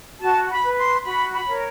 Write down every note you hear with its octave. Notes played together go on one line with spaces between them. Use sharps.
F#4 A5
B5
B4
C6
F#4 B5
B5
A#4 C#5